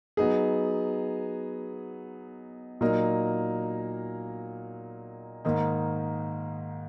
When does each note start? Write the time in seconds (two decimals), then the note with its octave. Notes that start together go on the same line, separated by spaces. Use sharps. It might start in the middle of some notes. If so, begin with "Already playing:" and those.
0.17 F#3 B3 D#4 G#4
2.81 A#2 F#3 A#3 D#4 A#4
5.45 G#2 D#3 A#3 D#4